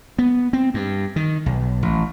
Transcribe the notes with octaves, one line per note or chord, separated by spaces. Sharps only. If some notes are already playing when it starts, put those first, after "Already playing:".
B3
C4
G2
D#3
B1
A1